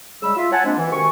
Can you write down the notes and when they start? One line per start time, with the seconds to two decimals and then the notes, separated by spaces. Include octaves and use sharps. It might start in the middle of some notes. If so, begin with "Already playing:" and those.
0.22 C#3 G3 G#3 B5 E6
0.37 F4 E5
0.52 C#5 F#5 G#5 A5
0.64 F3 G#3 A#3 C4 D4
0.78 E3
0.92 C3 D#3 F#4 G#5 C#6